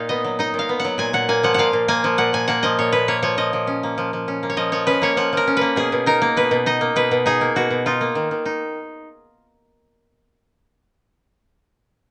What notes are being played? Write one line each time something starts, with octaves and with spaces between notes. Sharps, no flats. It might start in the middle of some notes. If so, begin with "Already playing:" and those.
Already playing: A#2 D#4 F5
B3 D#5
F#3
D#4 D#5
A#2
F5
B3
F#3 F#5
A#2 G#5
A#2 F#5
A#3 G#5
F3 F#5
A#2 F5 F#5
A#2
A#3 G#5
F3
A#2 F#5
A#2 G#5
A#3 F#5
F3 D#5
A#2 C#5
A#2 B4
A#3 C#5
F3 C#5
F3 D#5
F3
C#4
A#3
F3
F3
C#4
A#3
C#5
F3 D#5
F3 C#5
C#4 B4
A#3 C#5
F3 F#5
F3 A#4
C#4
A#3 B4
B2 G#4
B2
D#4 A#4
A#3
B2 B4
B2
D#4 D#5
A#3
B2 B4
B2
D#4 G#4
A#3
B2 F#4
B2
D#4 F4
A#3
D#3
D#3
D#4